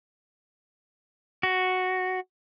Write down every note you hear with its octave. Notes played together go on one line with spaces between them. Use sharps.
F#4